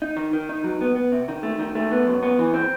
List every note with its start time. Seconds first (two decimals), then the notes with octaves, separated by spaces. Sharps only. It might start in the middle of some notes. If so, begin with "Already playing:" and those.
0.02 D#4
0.17 D#3
0.33 D#3
0.49 D#4
0.64 F#3
0.81 B3
0.96 B3
1.12 C3
1.28 D#3
1.43 A3
1.59 D#3
1.75 A3
1.91 B3
2.07 F#2
2.23 B3
2.39 E3
2.54 C4